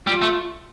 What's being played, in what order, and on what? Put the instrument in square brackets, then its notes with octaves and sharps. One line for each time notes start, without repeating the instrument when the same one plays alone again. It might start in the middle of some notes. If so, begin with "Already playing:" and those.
[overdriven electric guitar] G3 [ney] F4
[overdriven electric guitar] A3